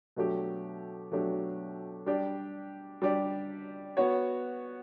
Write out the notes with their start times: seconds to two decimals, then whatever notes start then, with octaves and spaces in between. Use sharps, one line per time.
0.16 B2 F#3 A3 D4 G4
1.11 B2 F#3 A3 D4 G4
2.06 G3 D4 G4 D5
3.02 G3 D4 G4 D5
3.97 B3 F#4 C#5